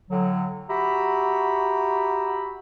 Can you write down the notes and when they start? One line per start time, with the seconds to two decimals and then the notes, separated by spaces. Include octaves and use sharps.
0.10 A2 D3 F#3
0.69 F#4 G4 E5 A#5 B5